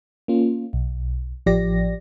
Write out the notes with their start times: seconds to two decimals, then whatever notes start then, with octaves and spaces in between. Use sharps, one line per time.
0.28 A#3 C#4 F4
0.73 B1
1.46 A1 F3 G4 D5 A#6